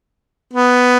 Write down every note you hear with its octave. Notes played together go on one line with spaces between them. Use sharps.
B3